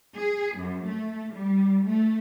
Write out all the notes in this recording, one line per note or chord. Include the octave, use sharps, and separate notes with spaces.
G#4
F#2
A3
G3
A3